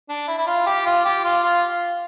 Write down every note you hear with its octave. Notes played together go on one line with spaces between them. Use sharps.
D4
E4
E4
F4
G4
F4
G4
F4
F4